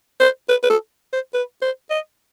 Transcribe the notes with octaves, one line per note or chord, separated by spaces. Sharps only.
C5
B4
B4
A4
C5
B4
C5
D#5